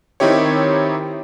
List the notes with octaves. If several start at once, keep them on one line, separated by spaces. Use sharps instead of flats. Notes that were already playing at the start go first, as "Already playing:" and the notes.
D#3 C4 D#4 E4 G4 C#5